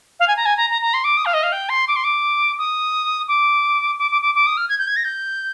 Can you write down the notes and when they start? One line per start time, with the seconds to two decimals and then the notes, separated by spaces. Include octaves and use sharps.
0.20 F5
0.28 G#5
0.37 A#5
0.45 G#5
0.57 A#5
0.70 A#5
0.82 A#5
0.94 C6
1.04 D6
1.17 D#6
1.25 F5
1.34 D#5
1.43 F5
1.52 G5
1.69 C6
1.88 D6
1.96 C6
2.04 D6
2.58 D#6
3.28 D6
3.98 D6
4.11 D6
4.22 D6
4.35 D6
4.47 D#6
4.57 F6
4.69 G#6
4.79 G6
4.88 G#6
4.96 A#6
5.04 G6